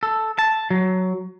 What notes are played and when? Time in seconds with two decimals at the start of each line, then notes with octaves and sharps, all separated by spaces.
0.03 A4
0.39 A5
0.70 F#3